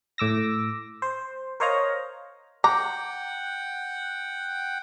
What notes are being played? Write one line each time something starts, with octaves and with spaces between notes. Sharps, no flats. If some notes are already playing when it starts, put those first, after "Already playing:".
A2 D6 E6 A#6
C5
A#4 C5 C#5 D#5 F5 A#5
F#5 G5 A#5 D6